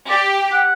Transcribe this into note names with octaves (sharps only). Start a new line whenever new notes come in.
G4 D5
F#5